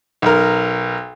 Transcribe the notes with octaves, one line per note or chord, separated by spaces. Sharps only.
B1 A#4